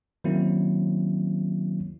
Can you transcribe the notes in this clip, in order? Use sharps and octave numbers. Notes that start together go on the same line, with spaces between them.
D#3 F#3 A#3 C4 C#4 E4